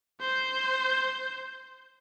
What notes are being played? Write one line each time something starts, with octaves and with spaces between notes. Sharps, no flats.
C5 G6